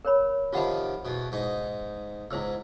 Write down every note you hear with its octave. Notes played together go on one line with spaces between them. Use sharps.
A#4 C#5 B5
C3 D#3 F3 F4 F#5 B5
E2 B2
G#2 D#4
C#2 G#2 E4 C5 E6